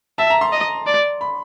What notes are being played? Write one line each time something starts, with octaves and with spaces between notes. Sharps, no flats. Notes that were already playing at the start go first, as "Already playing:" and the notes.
E5 A5
A#5
C6
D#5
D5
B5